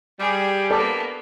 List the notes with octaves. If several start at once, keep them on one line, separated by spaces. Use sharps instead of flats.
G3 G#4
A#3 B3 A4 D5